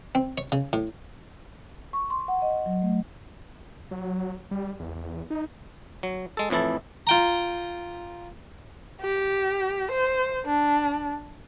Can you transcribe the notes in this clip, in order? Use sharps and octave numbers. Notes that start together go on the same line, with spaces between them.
C4
C#5
C#3
A2
C#6
C6
F#5
D#5
F#3
A3
F#3
G3
E2
D#4
F#3
G#3 A4
F2 A2 E3 E4 A5
F4 G5 A#5
G4
C5
D4